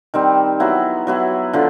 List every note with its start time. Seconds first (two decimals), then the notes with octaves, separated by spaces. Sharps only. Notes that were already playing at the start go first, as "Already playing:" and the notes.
0.14 D#3 G3 C4
0.60 F#3 B3 E4
1.07 F#3 B3 E4
1.53 D3 F3